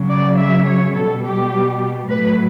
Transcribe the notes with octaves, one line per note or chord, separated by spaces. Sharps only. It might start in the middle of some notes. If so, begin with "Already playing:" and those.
Already playing: C#3 F#3
D5
E5
C#5
B2 G3 A4
G4
A2 F#3 B4